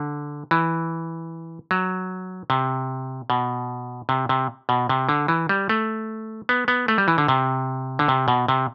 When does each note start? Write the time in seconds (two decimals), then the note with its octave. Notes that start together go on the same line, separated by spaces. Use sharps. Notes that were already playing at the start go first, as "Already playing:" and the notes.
Already playing: D3
0.51 E3
1.71 F#3
2.50 C3
3.30 B2
4.09 C3
4.29 C3
4.69 B2
4.89 C3
5.09 D3
5.28 E3
5.49 G3
5.69 A3
6.49 B3
6.68 B3
6.88 A3
6.98 G3
7.08 E3
7.18 D3
7.28 C3
7.99 D3
8.08 C3
8.28 B2
8.48 C3